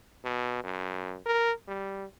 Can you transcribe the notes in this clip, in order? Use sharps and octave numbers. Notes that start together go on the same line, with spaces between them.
B2
F#2
A#4
G3